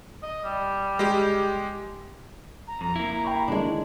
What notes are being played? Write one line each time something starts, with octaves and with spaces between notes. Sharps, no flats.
D#5
G3
G#3 G4
A#5
F2 A#5
A#3 E4
G5 B5 C#6
D3 D#3 G#3 C#4 D4